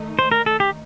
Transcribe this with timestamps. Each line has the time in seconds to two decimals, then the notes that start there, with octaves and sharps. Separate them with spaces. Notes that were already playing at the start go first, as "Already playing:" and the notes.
Already playing: D#3 A3 D#4
0.19 C5
0.32 A#4
0.46 A4
0.60 G4